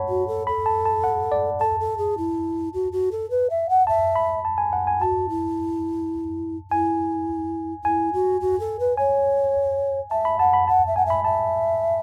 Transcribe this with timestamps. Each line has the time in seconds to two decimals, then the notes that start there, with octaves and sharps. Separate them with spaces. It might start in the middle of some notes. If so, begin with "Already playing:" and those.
Already playing: C#5 F#5 A5 B5
0.09 F#4
0.28 A4
0.47 A4 B5
0.66 A5
0.86 A5
1.04 F#5
1.32 D5
1.60 A4 A5
1.80 A4
1.98 G#4
2.18 E4
2.74 F#4
2.92 F#4
3.12 A4
3.30 B4
3.50 E5
3.69 F#5
3.87 E5 A5
4.16 B5
4.45 A5
4.58 G#5
4.73 F#5
4.87 G#5
5.01 F#4 A5
5.29 E4
6.71 E4 G#5
7.84 E4 G#5
8.13 F#4
8.41 F#4
8.60 A4
8.79 B4
8.97 C#5 G#5
10.11 E5 A5
10.25 B5
10.39 F#5 A5
10.54 B5
10.68 F#5 A5
10.87 E5
10.96 F#5 G#5
11.06 E5 B5
11.25 E5 A5